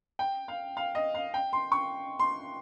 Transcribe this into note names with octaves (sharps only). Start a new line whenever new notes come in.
G5
F5
F5
D#5
F5
G5
C6
C#6
C6